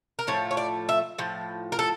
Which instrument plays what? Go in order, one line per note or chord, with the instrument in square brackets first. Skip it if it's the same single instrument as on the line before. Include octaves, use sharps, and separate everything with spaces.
[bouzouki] A#4
A2 F3 A3 C#5
C#5
D5
E5
A2 F3
A#4
A4